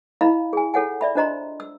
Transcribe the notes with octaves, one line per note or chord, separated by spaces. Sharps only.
E4 D#5 F5 A#5 B5
G#4 G#5
F4 A4 C#5 F#5 G#5
D5 E5 B5
D4 F4 C5 D#5 A#5 C6
E6